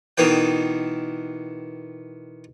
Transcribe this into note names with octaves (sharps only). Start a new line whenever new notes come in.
B2 D#3 E3 G5